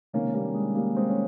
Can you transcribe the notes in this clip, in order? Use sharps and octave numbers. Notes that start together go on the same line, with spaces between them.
C#2 C3 D#3 A#3 C#4
G3 A#3
G#3
G3 A#3
G#3 C4
C#4